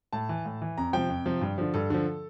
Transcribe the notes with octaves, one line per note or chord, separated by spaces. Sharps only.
A2 A5
E3
A2
E3
F2 A#5
C3 F3 G5
F2
C3 F3
G2
D3 F3
G2 A4
D3 F3